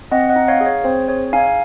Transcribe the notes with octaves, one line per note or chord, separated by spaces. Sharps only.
C4 D#5 F#5
D#5 F#5
D#4
C#5 F5
G#4
C#5
C4 C5
G#4 C#5
D#4 F5 G#5